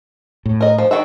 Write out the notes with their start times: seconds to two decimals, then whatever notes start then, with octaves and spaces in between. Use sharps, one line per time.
0.46 A2
0.61 A#4 D#5
0.78 F3
0.91 D#3 F#4 E5